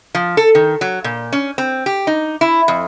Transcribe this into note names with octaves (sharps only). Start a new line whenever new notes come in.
F3
A4
D#3
F#3
A#2
C#4
C4
G4
D#4
E4
F2